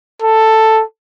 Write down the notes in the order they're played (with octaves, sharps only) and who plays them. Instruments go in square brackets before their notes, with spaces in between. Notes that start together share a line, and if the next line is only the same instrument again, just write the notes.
[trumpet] A4